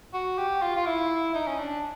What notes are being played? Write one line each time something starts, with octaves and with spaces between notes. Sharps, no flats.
F#4
G4
F4
F4
E4
D#4
C#4
D4